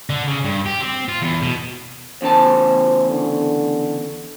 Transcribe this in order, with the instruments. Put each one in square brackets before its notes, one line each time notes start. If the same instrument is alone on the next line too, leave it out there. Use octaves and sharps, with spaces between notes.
[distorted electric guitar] D3
C#3
G2
G4
C4
F4
E2
B2
[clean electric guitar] E2 C#3 A5 [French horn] C5
[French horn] D3